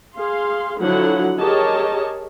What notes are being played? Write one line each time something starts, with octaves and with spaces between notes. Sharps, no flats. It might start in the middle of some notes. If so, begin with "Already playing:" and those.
G#4 F5 C6
D3 F3 F#3 E4 F#5
G4 G#4 A#4 C#5 D#5 A5